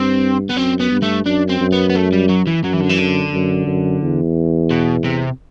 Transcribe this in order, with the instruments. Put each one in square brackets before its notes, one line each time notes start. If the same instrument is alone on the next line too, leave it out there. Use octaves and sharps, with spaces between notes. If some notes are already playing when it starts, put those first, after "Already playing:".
Already playing: [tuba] G2 [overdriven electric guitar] C4
[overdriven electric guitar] B3
[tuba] F#2 [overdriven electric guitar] C4
[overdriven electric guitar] B3
[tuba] G2
[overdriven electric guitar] A3
[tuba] F#2 [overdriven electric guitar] D4
[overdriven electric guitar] C4
[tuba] F#2
[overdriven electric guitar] B3
B3
A3
G3
F#3
E3
[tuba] F#2 [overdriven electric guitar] F#3
[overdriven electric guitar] E3
D3
E3
D3
[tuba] F#2
F#2
E2
[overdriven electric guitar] B2
C3